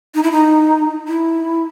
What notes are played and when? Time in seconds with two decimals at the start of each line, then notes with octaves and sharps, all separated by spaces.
0.15 D#4
0.23 E4
0.32 D#4
1.08 E4